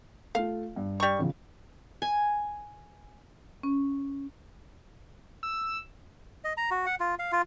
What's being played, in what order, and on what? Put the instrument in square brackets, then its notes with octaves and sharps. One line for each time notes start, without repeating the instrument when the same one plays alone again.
[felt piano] A3 F4 [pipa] F5
[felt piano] G2
[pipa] G3 C#6
[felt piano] A1 C#3 F3
[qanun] G#5
[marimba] C#4
[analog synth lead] E6
[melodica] D#5
A#5
F#4
F#5
F4
F5
F4